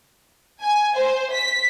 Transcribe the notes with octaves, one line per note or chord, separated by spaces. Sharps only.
G#5
C5
B6